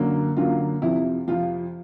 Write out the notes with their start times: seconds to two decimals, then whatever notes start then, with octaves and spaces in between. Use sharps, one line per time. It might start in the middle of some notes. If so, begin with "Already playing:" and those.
Already playing: F#2 D3 F#3 A#3
0.37 F#2 D3 F#3 A#3 F4
0.82 F2 C3 F3 E4
1.28 F2 C3 F3 F4